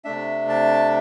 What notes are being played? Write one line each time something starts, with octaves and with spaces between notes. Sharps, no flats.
C3 A3 D4 E5
A5